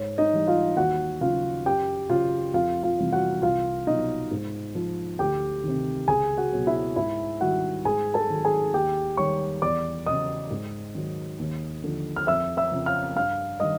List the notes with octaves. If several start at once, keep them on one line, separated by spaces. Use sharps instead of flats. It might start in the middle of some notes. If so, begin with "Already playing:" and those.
Already playing: G#2 C#5
D#4 D#5
E3 G3
F4 F5
D#2 F#4 F#5
C#3 F#3 F4 F5
F#2 G4 G5
C#3 F#3 F4 F5
F2 F4 F5
F4 F5
C3 E3 G3
F#4 F#5
C2 F4 F5
B2 F#3 D#4 D#5
G#2
F3
D2 G4 G5
C3 D#3
C#2 G#4 G#5
F#4 F#5
B2 F#3
E4 E5
G#2 E4 E5
D#3 G3 F#4 F#5
G#2 G#4 G#5
A4 A5
D#3 F#3
G#4 G#5
D#2 G4 G5
D#3 G3 C#5 C#6
E2 D5 D6
C#3 F#3 D#5 D#6
G#2
D#3 F#3
D#2
D3 F3
F6
F2 E5 E6
E5 E6
C#3 F3
F5 F6
G2 F5 F6
D#3 G3 D#5 D#6